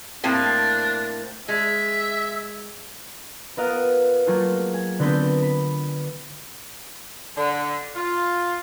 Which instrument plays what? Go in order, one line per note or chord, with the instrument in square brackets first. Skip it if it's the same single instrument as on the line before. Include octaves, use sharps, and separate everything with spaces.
[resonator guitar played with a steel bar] A2 A#3 C4 [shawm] D4
[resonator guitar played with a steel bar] G#3 [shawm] E5
[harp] B3 F4 A#4 D#5 F5 F#5
F#3 A3 A#3 F4 G#4
G#5
D3 B3 C4 A4 B4 G6
B5
[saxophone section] D3
F4